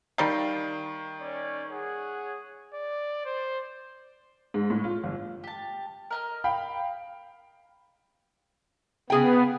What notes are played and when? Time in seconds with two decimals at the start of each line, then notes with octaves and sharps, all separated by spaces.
0.18 D#3 G3 A#3 C7
1.21 C#4 C#5 D5
1.69 G#4 C#5 F#5
2.74 D5
3.25 C5
4.54 G#2
4.70 A2
4.84 F4
5.03 G1
5.44 G4 A5
6.11 A#4 D#5 F6
6.44 F5 G5 B5
9.10 C#3 B3 G#4 G5